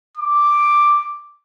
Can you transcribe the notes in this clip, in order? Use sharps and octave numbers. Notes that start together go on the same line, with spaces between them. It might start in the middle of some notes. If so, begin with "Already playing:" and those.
D6